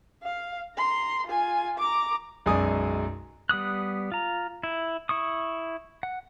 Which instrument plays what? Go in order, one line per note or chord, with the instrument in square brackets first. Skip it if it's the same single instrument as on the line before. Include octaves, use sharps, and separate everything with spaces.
[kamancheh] F5
A#5 C6
F4 G#5
A#5 D6
[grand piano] B1 F#2 G#3 D5 G#5 D#6
[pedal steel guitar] G3 B3 D#6 F#6
F4 A#5
E4
E4 C#6 D#6
F#5